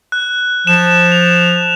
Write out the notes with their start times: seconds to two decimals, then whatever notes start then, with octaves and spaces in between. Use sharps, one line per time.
0.12 F#6
0.67 F3 E7
1.12 F7